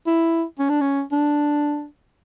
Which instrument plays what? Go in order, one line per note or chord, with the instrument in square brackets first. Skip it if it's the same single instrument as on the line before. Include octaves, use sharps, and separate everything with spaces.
[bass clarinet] E4
C#4
D4
C#4
D4